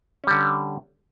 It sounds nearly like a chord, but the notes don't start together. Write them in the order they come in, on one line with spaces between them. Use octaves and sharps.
C#4 G3 D3